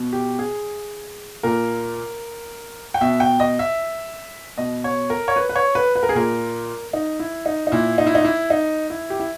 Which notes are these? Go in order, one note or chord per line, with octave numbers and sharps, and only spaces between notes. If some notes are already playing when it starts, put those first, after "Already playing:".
Already playing: B2
G4
G#4
A#2 A#4
G5
B2 E5
G5
D#5
E5
B2 D#5
C#5
A#4
C#5
B4
B4
C#5
B4
B4
A#4
G#4
A#2 A#4
D#4
E4
D#4
D#4
A#2 E4
D#4
E4
D#4
E4
D#4
E4
G4
E4